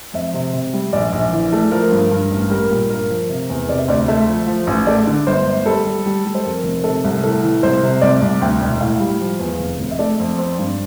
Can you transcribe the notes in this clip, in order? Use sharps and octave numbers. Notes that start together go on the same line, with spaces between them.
F2 E5
C3
C3
G3
A#1 D5
A#1
E3
A3
F3 A#4
G2
G2
A1
G3 A#4
A#2
G2 A#4
F3
C3
E2
C3 D5
E5
D2 D5
A3 E5
F3
F3
A1
A3 D5
D3
G1 C5
G1
G3 A4
G3
G3
G3
C5
F2 A#4
F1
C3 A4
C2
A2 A4
E3
C2 C5
C3
C2 D5
C2
D2 G5
E1
A2 F5
G3
F3
E2
F1
F1
E5
A3 D5
F2
C4
G2